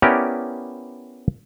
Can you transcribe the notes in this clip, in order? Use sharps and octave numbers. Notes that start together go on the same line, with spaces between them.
B3 C#4 E4 G4 A#4 D5